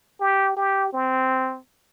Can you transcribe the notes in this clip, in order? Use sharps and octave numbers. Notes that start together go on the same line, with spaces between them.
G4
G4
C4